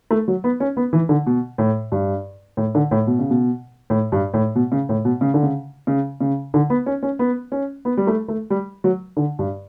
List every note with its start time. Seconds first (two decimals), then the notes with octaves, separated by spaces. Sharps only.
0.11 A3
0.28 F#3
0.44 B3
0.60 C#4
0.77 B3
0.93 E3
1.09 D3
1.26 B2
1.58 A2
1.92 G2
2.57 A2
2.75 D3
2.91 A2
3.07 B2
3.19 C#3
3.30 B2
3.90 A2
4.12 G2
4.34 A2
4.55 B2
4.72 C#3
4.89 A2
5.05 B2
5.21 C#3
5.34 D3
5.43 C#3
5.87 C#3
6.20 C#3
6.54 D3
6.70 B3
6.86 C#4
7.03 C#4
7.19 B3
7.52 C#4
7.85 B3
7.97 G3
8.07 A3
8.28 A3
8.50 G3
8.84 F#3
9.17 D3
9.39 G2